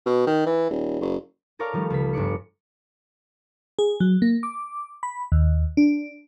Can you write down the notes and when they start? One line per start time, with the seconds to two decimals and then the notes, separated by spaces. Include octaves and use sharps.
0.06 B2
0.27 D#3
0.46 E3
0.70 D#1
1.01 F#1
1.59 A4 A#4 C#5 D5 F5
1.73 D#3 F3 G3 A3
1.90 C#2 B6
2.13 G1 D4 D5 C#7
3.79 G#4
4.00 F#3
4.22 A#3
4.43 D6
5.03 B5
5.32 D#2
5.77 D4